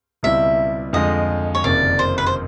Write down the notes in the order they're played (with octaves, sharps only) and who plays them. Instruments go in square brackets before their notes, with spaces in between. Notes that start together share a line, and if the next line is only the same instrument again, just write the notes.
[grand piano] C#2 B2 G3 C4 E4 [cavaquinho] E5
[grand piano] F2 D3 F3 G#3 [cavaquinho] D#5
[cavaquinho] C#5
[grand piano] F#1 F2 C3 D#3 [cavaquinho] D5
[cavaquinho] C5
B4
C5